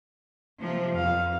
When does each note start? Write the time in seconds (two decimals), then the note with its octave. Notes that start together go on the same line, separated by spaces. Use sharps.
0.60 C3 F3
0.95 F2 F5